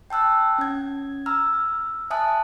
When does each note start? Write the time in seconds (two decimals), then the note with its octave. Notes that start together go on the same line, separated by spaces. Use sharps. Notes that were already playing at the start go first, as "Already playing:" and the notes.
0.10 G5 A5 E6 F#6
0.58 C#4 G#6
1.26 A#5 E6 F6
2.10 E5 G#5 A5 D#6 F#6